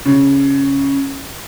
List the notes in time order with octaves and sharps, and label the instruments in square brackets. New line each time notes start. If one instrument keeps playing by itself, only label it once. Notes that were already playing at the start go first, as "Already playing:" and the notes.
[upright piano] C#3